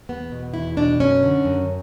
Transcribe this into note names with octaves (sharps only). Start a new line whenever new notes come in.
E2 B3
B2
E2 E4
B2 D4
F#2 C#4
D3
F#2